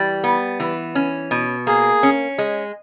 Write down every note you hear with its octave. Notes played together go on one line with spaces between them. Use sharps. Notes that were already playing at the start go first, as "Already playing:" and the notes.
Already playing: E3 G3
B3
E3
C#4
B2
A#3 G#4
C#4
G#3